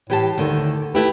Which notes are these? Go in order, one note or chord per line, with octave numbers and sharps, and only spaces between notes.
A2 E3 G4 A5
D2 D3 D#3
A3 E4 G4 B4